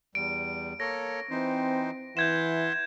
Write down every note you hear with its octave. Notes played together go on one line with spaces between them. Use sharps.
E2 G3 D7
A#3 A4 C#5 A#6
E3 C4 D#4 C5
E3 E5 F#5 C6 G6 G#6 E7